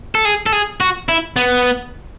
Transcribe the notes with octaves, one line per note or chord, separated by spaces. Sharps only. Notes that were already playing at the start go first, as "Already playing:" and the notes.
A4
G#4
A4
G#4
F#4
E4
B3